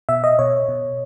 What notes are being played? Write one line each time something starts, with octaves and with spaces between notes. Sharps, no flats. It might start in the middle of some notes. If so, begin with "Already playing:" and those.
B2 E5
D#5
B2 C#5
B2